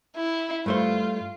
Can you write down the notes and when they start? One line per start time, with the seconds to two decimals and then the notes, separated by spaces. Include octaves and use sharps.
0.16 E4
0.66 G2 A3 F4 C5